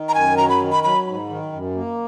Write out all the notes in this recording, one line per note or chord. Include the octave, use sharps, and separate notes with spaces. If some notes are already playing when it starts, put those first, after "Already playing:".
Already playing: D#3
A#5
F#2 G#5
F#3 A#5
B5
D#3
B5
F#3 B5
G#2
D#3
F#2
A#3